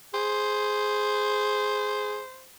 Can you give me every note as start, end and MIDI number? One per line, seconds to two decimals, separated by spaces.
0.14 2.21 68
0.14 2.47 72